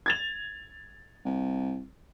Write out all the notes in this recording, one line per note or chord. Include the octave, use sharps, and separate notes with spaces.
G#6 A6 F7
C2